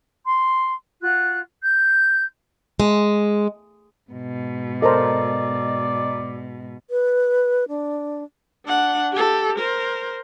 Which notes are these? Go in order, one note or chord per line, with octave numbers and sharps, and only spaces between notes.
C6
F4 F#4 F#6
G6
G#3
G#2 B2
A4 A#4 C5 D5 D#5 A#5
B4
D4
D4 F#5
G4 A4
A#4 C5